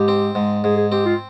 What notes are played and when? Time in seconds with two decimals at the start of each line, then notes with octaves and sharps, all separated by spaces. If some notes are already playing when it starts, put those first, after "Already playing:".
Already playing: G#2 G4
0.08 C4
0.35 G#2
0.64 G#2 G#4
0.77 G#4
0.92 C4 G4
1.06 F4